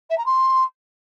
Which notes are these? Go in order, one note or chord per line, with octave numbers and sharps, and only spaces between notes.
E5
A#5
C6